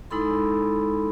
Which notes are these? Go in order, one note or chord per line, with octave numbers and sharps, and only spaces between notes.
G#3 D#4 E4 A4 B5 C6